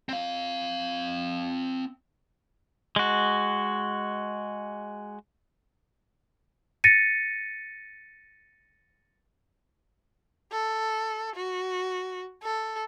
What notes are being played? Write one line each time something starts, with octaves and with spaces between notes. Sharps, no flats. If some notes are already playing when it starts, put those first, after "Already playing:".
C4 F5
G#3 F#4
A6 A#6 C#7 D#7
A4
F#4
A4